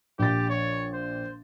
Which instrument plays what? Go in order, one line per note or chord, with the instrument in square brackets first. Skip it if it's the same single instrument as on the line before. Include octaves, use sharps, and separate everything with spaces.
[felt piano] A#1 A6 [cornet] G4
[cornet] C#5
C5